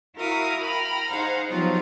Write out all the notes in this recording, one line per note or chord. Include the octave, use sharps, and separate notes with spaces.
E4 F#4 A#4 F5 D#6
G5 A#5 B5 F6
D#4 G#4 C5 F5 F#5 A#5
F3 F#3 B3 D#4 F4 G4